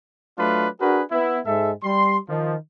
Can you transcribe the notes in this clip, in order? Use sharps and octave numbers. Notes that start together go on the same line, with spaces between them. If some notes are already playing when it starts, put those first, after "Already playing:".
F#3 A3 D4 F4 B4
D4 F#4 G#4 A#4 B4
B3 E4
G#2 G#3 A4 E5
G3 C6
D#3 F3